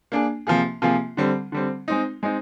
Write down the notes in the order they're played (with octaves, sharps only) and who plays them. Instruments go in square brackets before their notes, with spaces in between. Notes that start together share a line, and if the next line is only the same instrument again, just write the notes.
[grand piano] A#3 D4 G#4
C3 F3 A#3 F4 G#4
C3 F3 A#3 F4 G#4
D3 G3 C4
D3 G3 C4
G#3 C4 D#4
G#3 C4 D#4